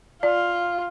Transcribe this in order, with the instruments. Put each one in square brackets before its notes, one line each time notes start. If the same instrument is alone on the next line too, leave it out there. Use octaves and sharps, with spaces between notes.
[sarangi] F4 [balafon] D5